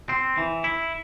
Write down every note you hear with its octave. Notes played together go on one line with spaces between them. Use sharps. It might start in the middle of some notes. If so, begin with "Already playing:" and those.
C4
E3
E4